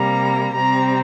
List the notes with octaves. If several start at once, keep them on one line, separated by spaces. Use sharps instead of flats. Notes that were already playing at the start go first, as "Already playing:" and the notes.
Already playing: C3 G3 A#3 A#5
C3 G3 C4 A#5